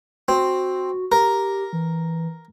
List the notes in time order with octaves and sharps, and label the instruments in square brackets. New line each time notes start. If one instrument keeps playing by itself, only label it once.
[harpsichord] C4 [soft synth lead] F#4
[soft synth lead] G4 [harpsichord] A#4
[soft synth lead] E3